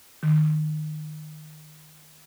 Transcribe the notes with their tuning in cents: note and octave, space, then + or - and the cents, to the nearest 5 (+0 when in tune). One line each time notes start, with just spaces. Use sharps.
D#3 -20